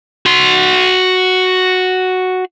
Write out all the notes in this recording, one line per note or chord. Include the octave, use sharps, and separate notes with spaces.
F#4 C6